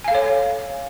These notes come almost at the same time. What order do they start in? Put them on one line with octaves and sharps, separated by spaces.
G#5 F5 A4 C#5